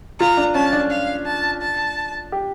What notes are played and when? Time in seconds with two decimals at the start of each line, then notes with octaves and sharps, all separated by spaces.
0.19 F4 A#5
0.37 D4
0.55 C#4 A5
0.73 D4
0.91 F5
1.26 A5
1.62 A5
2.32 G4